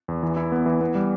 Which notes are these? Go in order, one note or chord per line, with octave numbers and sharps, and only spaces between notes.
E2
E3
E4
B3
E3
B3
G3